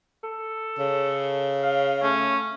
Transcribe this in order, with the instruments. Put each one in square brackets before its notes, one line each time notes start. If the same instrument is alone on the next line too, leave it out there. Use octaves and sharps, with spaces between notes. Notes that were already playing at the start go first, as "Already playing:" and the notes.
[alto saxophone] A4
[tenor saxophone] C#3
[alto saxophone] F5
[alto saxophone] A3 [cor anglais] C#4